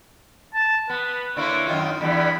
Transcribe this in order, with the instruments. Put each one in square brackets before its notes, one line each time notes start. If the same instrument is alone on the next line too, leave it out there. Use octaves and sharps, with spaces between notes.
[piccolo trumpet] A5
[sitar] B3 [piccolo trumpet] B4
[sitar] D3 A#3 E4 [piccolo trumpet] C#5
[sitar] F#2 D#3 F4
[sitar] E2 G2 E3 [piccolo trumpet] B5